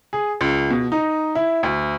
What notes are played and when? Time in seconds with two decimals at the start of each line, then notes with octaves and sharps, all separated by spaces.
0.13 G#4
0.41 C#2
0.71 B2
0.92 D#4
1.35 E4
1.63 D2